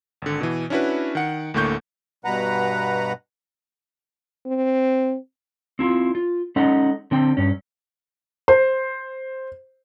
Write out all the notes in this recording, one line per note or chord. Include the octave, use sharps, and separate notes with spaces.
G#1 D3
B2 E3
C#4 D4 E4 F#4 B4
D#3 F#5 C#7
D2 A2 D3 A#3 C#6 G6
G2 B2 B4 F#5 A#5
C4
C4 E4 F4
F4
G#3 C#4 D#4 A4 F#5
D3 C4 G5
G2 C#4
C5